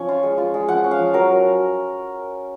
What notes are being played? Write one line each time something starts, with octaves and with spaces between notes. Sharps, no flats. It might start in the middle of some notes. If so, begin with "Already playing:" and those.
Already playing: F3 C#4 C#5
F4
G#3
F4
G#3
F3 F#5
C#4
F5
F3
F#3 A#4